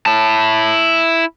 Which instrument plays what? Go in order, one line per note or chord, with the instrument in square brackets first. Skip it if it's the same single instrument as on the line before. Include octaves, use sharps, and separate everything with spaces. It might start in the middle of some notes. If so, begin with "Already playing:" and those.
[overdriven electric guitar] E4 A5